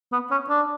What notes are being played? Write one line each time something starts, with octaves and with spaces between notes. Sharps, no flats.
B3
C#4
D4